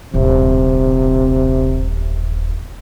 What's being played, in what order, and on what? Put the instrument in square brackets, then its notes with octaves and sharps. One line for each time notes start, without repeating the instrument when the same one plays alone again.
[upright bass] D#1 A1 [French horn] C3